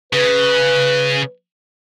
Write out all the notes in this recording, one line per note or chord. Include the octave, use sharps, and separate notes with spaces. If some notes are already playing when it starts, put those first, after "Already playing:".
C#3 B4